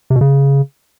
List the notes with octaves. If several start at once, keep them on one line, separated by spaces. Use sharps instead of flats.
C3
B2
C#3